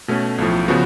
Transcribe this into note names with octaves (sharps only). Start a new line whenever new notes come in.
B2 A3 C#4
B1 A2 F3
C#3 F3 B3 F#4